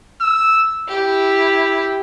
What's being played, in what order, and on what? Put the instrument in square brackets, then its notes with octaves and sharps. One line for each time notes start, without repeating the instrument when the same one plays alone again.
[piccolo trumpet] E6
[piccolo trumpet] E4 [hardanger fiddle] G4